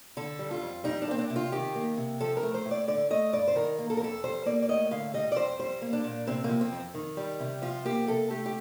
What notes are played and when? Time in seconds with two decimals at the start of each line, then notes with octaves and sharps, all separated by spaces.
0.17 D3 A4
0.39 G3
0.51 F4
0.62 F2
0.84 G3 D#4
1.02 D4
1.07 A#3 C4
1.18 D4
1.30 C3
1.36 F4
1.52 D#3 G4
1.75 A#3
1.97 C3
2.20 F3 A4
2.37 A#4
2.43 A3
2.54 C5
2.65 A2
2.71 D5
2.88 D3 D5
3.10 A3 D#5
3.33 G2 D5
3.47 C5
3.55 D#3 A#4
3.79 A#3
3.90 A4
3.97 A#4
4.01 F2 A4
4.24 G3 C5
4.46 A#3 D5
4.62 D5
4.69 A2 D#5
4.91 D3 F5
5.14 G3 D#5
5.32 D5
5.36 F2 C5
5.59 G3 C5
5.82 A#3
5.93 D4
6.04 A#2
6.27 C3 C4
6.44 F3 A#3
6.61 C4
6.72 F2
6.94 D#3
7.17 G3
7.40 C3
7.62 F3 F4
7.85 A#3 G4
8.08 C3 A4
8.30 A3 G4
8.46 G4